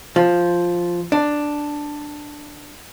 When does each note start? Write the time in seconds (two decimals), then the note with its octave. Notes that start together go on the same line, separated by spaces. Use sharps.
0.16 F3
1.12 D4